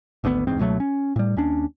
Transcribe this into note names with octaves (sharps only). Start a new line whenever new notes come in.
G#1 D2 D#3 B3
D1 E2 G#2 C4
C#2 B2 F#3 A3
C#4
A2 G3
D#2 C#4 D4